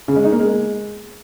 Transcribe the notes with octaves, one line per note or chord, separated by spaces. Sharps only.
C#3
G#3
D#4
A#3
G#3